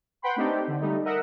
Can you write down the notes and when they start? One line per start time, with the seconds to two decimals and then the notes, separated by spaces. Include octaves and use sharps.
0.22 B4 F#5 G5 B5 C6
0.36 A3 C4 D4 D#4 G4
0.68 D3
0.81 G3 A3 D#4
1.04 A#4 D#5 E5 F#5